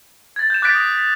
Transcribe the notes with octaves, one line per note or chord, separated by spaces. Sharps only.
G#6 A6
G6 E7
D6 F#6 G6 A6 B6 D7
D#6 A#6
B6